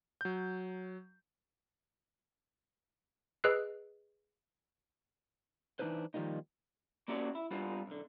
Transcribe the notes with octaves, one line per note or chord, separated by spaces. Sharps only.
F#3 G6
G#4 B4 D#5 E6 F#6 C7
E3 A#3 D4 D#4 B4 C5
D#3 F3 G3 A#3 D#4
A#3 C#4 F#4 G4 D5
E4
G3 B3 D4 F4
B1 D3